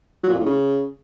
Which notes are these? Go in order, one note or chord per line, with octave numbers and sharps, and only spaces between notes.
F#3
A#2
F2
A2
C#3